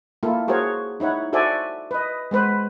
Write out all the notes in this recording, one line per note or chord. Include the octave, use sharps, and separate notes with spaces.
A#3 E4 F4 A4
F#4 G#4 A#4 C5 C#5
D#4 E4 C#5 F#5
F#4 A4 C5 D5 E5 G#5
B4 D#5
G#3 B3 B4 C5